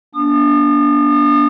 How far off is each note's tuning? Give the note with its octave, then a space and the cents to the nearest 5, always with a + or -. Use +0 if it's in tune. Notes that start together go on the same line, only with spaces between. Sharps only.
A#3 +45 D4 -20 D#6 -40